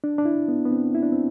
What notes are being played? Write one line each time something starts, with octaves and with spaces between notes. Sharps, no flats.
D4
D4
E4
B3
B3
C4
E4
D4
C4